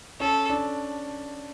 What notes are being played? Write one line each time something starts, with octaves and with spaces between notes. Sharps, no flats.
C#4 A4
D4